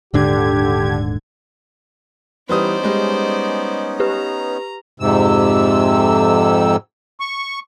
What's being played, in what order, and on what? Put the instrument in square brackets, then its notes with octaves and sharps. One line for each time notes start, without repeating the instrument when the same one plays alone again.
[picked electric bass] D#1 G#2 D4 [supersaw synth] D3 G#6 [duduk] G4
[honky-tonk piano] E3 G3 D#6 [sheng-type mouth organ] B3 C#4 D#4 [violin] C5 D5
[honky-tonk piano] G3 G#3
[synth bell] G4 B4 [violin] A#5
[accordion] F2 G#2 C3 E6
C#6